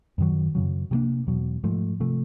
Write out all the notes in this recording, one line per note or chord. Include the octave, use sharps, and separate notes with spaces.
F#2 D#3 F#3
F#2 C#3 F#3
C3 F3 A#3 D4
E2 B2 F#3
G#2 F3 A3
C3 F3 A3